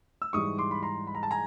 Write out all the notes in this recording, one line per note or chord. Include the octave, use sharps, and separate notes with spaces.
E6
G#2 E3 G3 C#6 D#6
C6 D6
B5
A#5 C6
B5
A#5
A5
G#5 A#5